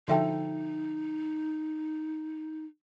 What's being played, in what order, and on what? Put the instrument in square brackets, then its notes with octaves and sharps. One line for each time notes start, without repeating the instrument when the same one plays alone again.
[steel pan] D3 F3 A4 [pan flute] D#4 [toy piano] F#4 E5 G5